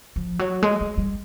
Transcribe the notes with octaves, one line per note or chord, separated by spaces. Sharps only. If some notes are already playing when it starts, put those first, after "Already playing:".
F3
F#3
G#3
G#3
G3